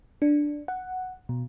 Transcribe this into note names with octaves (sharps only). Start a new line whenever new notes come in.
D4
F#5
B2